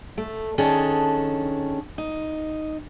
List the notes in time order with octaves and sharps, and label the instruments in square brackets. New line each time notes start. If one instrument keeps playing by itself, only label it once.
[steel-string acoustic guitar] A3
D#3 C#4 D4 G#4 A4
D#4